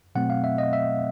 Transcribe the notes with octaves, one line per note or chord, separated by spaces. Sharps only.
B2 F#3 A3 C4 F#5
F5
E5
D#5
E5